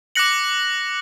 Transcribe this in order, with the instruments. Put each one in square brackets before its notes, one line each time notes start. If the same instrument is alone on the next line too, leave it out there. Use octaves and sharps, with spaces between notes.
[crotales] D6 F#6 A#6 C#7 F#7